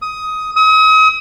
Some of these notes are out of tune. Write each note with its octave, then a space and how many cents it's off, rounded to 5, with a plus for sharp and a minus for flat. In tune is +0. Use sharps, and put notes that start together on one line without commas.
D#6 +15
D#6 +40